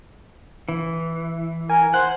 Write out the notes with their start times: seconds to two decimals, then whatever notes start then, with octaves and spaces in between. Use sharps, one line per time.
0.69 E3
1.70 A#4 G#5
1.94 C5 F#5 F#6